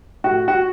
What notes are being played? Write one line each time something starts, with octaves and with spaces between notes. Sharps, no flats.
A2 F#4
F#4